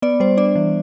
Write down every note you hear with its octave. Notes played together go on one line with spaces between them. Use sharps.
B3 D5
G3 C5
D4 D5
E3